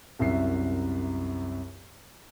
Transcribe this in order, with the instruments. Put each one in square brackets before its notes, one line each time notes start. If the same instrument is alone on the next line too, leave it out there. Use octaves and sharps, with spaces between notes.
[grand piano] C2 F#2 E5 C7